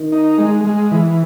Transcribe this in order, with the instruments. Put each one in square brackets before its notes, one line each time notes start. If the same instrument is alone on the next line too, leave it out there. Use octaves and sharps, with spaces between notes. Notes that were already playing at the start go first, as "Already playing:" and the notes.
Already playing: [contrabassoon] D#3
[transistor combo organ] D#4
G#3
G#3
E3